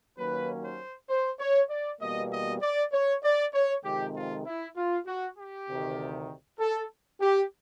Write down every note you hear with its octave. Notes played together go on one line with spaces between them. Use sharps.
D#2 D#3 F#3 A#3 C#4 B4
C5
C5
C#5
D5
E2 B2 G3 A#3 D#5
D#5
D5
C#5
D5
C#5
F2 C3 D#3 G#3 G4
F4
E4
F4
F#4
G4
D2 C3 D#3
A4
G4